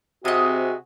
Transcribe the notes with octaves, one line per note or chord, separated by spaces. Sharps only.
C3 C4 F#4 G#4 D#5 D#6